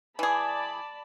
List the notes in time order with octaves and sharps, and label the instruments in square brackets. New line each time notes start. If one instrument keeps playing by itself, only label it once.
[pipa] E3 G#4 [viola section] D5 A5 B5